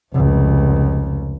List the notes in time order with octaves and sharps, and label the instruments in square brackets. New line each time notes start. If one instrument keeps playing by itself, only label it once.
[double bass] F1 C#2